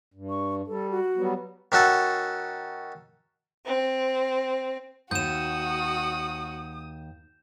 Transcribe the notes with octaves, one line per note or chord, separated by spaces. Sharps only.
G2
C#6
G3 A4
F#4
F#3 G3 B3
D#3 C#4 F#4 A4
C4
D#2 G#2 F#4 D#6 G6 E7